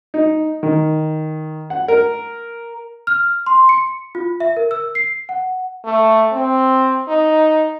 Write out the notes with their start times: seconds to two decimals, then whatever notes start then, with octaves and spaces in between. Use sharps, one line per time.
0.14 D#4
0.63 D#3
1.70 F#5
1.88 A#4
3.07 F6
3.46 C6
3.69 C#7
4.15 F4
4.40 E5
4.57 A#4
4.71 E6
4.95 C7
5.29 F#5
5.85 A3
6.32 C4
7.08 D#4